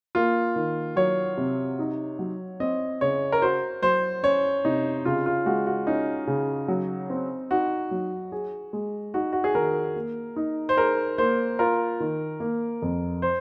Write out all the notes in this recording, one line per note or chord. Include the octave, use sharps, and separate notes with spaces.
A#3 F4
D#3
F#3 C#5
C3
D#4
F#3
C4 D#5
C#3 C#5
A#4
F#4 C5
F#3 C5
C#4 C#5
C3 D#4
C#3 F4
F4
G#3 F#4
F#4
C#4 D#4
C#3
F#3
C4
D#4 F#4
F#3
G#4
G#3
D#4 F#4
F#4
G#4
D#3 A#4
A#3
D#4
C5
G#4 A#4
A#3 C5
F4 A#4
D#3
A#3
F2
C5